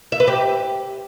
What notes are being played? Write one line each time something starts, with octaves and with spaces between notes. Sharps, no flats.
E5
B4
G4